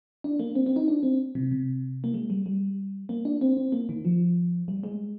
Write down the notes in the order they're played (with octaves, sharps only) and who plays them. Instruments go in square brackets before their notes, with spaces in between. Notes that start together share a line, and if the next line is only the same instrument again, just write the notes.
[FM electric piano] D4
A#3
C4
C4
D#4
D4
C4
C3
C3
A#3
G#3
G3
G3
A#3
D4
C4
C4
A#3
D#3
F3
G3
G#3